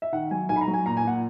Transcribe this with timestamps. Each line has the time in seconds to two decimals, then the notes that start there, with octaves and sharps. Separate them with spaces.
0.02 E5
0.12 D#3 F#5
0.31 F#3 G#5
0.49 B1 G#5
0.56 B5
0.61 A#5
0.68 F#3
0.74 G#5
0.86 A#2 A#5
0.97 G#5
1.05 A#2 F#5